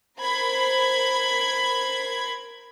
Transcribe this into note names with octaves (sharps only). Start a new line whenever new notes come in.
A#4 C5 B5 G#6